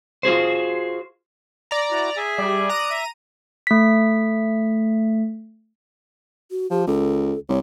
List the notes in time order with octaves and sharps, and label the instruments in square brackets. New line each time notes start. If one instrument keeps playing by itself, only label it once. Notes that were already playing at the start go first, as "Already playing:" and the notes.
[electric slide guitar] F4 F#4 G#4 C5
[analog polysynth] D5 A#5
[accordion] E4 F#4
G#4 E5 G#5
[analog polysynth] G3 [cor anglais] D5
[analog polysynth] A#5 D#7 [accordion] D#6 F#6
[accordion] E5
[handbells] A3 B6
[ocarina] F#4
[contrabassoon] F3 [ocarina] G4
[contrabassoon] C#2 [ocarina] A4
[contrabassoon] C2 [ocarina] C#5